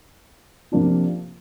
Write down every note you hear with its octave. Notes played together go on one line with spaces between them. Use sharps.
C3 F3 A#3 D4 F4